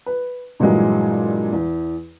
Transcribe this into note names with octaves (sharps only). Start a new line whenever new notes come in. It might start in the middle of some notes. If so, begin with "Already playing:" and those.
B4
G2 A#2 E3 F#3 G#3
E2